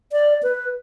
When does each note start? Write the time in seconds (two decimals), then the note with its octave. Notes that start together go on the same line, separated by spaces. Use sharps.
0.12 D5
0.43 B4